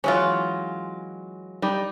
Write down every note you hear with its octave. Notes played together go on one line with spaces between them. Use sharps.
E3 F#3 G#3 C#4 F4
G3 D#4